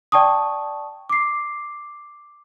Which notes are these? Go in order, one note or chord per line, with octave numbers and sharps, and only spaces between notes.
D5 G5 A5 C#6 D#6
D6 C7